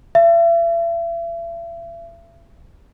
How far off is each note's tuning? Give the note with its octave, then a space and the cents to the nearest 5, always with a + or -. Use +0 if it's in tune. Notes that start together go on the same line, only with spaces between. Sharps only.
E5 +40